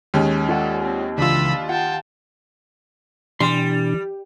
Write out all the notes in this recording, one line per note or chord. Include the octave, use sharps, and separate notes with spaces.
D#2 G#3 C#4
F4 A4 D5 F#5
C4
C#2 E3 D4 F4 B5 C6 E6
F4 F#5 G5 A5
B2 E3 G3 D4 C6